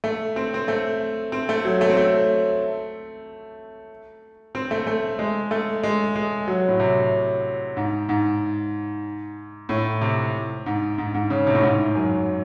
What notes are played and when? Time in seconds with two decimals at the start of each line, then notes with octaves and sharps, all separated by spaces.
0.04 A3
0.36 C4
0.54 C4
0.68 A3
1.32 C4
1.49 A3
1.65 F#3
1.81 A3
1.90 C4
1.97 A3
4.55 C4
4.71 A3
4.87 A3
5.19 G#3
5.51 A3
5.83 G#3
6.15 G#3
6.48 F#3
6.68 A2
6.80 C3
7.77 G#2
8.09 G#2
9.69 A2
10.01 C3
10.66 G#2
10.98 G#2
11.14 G#2
11.30 C#3
11.47 C3
11.55 A2
11.62 G#2
11.95 F#2